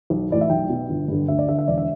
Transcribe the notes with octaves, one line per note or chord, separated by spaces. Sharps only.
B1
A2 E3 D5
E5
B1 G5
B2
G1
G2 D3
D2 E5
D5
D3 E5
E5
E1 D5
E5